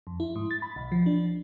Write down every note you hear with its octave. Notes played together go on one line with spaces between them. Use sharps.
F2
E4
G#2
A6
B5
B1
F3
D4